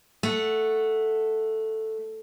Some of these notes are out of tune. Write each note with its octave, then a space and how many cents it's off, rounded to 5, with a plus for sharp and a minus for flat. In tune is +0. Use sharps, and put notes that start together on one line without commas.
A3 +0 F#5 +0